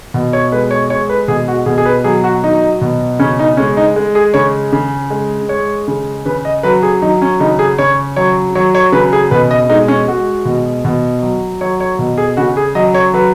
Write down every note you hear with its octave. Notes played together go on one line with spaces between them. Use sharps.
B2
C#5
G#3 B4
C#5
G#3 C#5
B4
B2 G#4
F#4
B2 G#4
G#4
B4
F#3 G#4
F#4
F#3 D#4
B2
C#3 C#4
D#4
G#3 C#4
D#4
G#3
G#4
C#3 C#5
C#3
G#3
G#3 C#5
C#3
C#3 B4
D#5
F#3 B4
G#4
F#3 D#4
C#4
C#3 D#4
G#4
C#3 C#5
F#3 C#5
F#3 C#5
C#5
C#3 B4
G#4
B2 B4
D#5
G#3 D#4
C#4
G#3 F#4
B2
B2
F#3
F#3 C#5
C#5
B2
G#4
C#3 F#4
G#4
F#3 D#5
C#5
F#3 B4